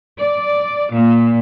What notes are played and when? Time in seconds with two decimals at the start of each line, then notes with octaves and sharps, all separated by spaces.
0.19 D5
0.91 A#2